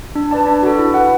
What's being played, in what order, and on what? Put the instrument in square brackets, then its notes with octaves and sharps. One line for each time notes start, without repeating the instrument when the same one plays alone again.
[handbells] D4
B4 D5 A5
D4
F#4 A4
E4
B4 F#5